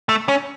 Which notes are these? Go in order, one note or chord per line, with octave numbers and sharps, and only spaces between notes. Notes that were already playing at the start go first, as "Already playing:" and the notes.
A3
C#4